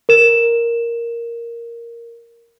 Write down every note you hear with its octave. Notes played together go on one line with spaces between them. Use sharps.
A#4 E7